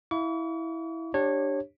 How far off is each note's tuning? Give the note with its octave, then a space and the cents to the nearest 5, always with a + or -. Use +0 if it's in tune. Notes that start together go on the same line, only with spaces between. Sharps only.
E4 -10 F5 +0 C#6 +45
D4 +10 G4 +0 C#5 -20